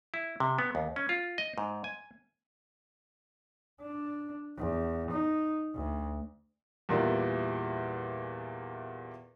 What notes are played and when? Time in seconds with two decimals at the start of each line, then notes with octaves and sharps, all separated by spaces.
0.14 E4
0.40 C3
0.59 B3
0.75 D#2
0.96 C#4
1.09 F4
1.38 D#5
1.58 G#2
1.84 G#5
3.82 D4
4.57 E2
5.11 D#4
5.75 D2
6.89 E2 A#2 E3 G3 A#4 D5